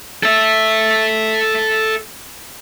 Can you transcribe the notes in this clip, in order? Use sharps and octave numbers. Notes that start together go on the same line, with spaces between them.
A4 E5